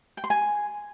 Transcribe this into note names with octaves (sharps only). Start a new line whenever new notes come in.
G5
C6
G#5